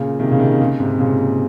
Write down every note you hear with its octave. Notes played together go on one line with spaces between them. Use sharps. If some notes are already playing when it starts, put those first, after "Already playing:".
Already playing: A#2 C#3
C3 D#3
C#3
C3 D#3
A#2 C#3
G#2 C3
A#2 C#3